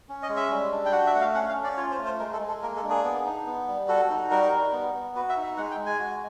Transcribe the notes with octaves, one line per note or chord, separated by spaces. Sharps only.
C#4
D#5
G#3
E5
G3
D4
G5
F#4 F#5
E5
A3 F#5
F5
C#4 F#5
F5
C#4
D5
F4 C#5
C5
A3
C5
G#3 A#4
A4
G#3
A4
A#3 A#4
A4
D4
G#4
B3
D#4
B3
G3
F#4 A4
D#4
G3 A#4
G3
B3
B3
F#4 B4
E5
D#4
E5
G#3 F#5
G5
G#3
G#5
F#4